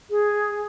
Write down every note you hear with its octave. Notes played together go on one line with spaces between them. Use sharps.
G#4